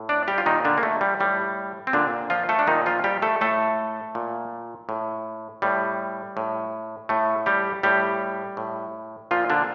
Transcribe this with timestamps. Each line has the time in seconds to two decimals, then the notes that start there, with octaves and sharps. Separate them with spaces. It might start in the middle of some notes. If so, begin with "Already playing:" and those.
Already playing: A2
0.09 D4 D5
0.28 G3 G4
0.38 F4
0.46 A#2 D#3 D#4
0.65 D3 D4
0.78 A#3
0.83 A3
1.01 G3
1.20 A2 G3
1.87 C4
1.93 A#2 D3 D4
2.30 F3 F4
2.49 A3 A4
2.59 D4
2.67 A#2 D#3 D#4
2.86 F3 F4
3.04 G3 G4
3.22 A3 A4
3.41 A2 A3 A4
4.15 A#2
4.89 A2
5.62 A2 G3
6.37 A2
7.09 A2 A3
7.46 G3 G4
7.83 A2 G3 G4
8.57 A2
9.31 A#2 F3 F4
9.50 D3 D4